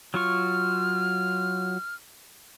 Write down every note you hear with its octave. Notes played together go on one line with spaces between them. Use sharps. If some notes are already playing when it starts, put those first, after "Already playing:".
F#3 F4 C#6 F6